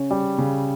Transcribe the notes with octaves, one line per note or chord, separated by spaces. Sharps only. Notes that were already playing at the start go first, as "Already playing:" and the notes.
Already playing: C#3 C#4
G3
C#3